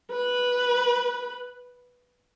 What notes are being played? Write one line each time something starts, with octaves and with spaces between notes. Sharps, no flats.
B4